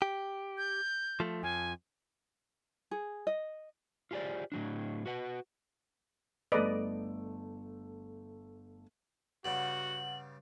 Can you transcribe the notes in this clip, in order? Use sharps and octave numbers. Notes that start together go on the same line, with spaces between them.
G4
G6
F3 A3
F2 F3 G#5
G#4
D#5
F4 G4 G#4 C5 D5
A2 F#3 D4
F#4 B4 F#5
G1 A3 B4 D5 D#5 D7
G2 C#3 G3 F#4 F#5 F#7